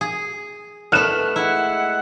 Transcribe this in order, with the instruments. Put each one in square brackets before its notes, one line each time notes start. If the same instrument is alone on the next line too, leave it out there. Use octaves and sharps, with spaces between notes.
[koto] G#4
[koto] A3 B3 [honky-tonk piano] F6 F#6 E7
[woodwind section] G#3 E5 F#5 [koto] E4